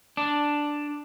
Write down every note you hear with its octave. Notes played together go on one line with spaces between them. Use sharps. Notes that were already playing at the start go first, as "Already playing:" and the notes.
D4